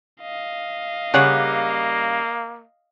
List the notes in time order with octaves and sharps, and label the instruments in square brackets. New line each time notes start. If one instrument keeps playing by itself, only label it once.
[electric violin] D#5 F5
[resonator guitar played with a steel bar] C#3 G3 [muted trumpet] A#3 [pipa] G#4 C#5 F#5